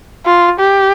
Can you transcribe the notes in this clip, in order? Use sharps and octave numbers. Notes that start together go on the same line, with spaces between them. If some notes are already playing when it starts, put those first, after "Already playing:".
F4
G4